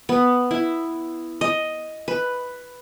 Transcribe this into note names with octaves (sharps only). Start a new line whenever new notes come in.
B3
E4
D#5
B4